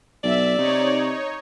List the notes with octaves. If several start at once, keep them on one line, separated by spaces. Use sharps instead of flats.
B1 D5 E5
C3 D#4 C#5